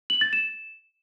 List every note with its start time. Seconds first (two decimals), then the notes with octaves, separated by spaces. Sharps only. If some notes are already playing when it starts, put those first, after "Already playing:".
0.10 F#7
0.21 A6
0.33 E7